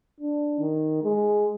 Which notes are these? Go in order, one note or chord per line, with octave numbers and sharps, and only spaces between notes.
D4
D#3
G#3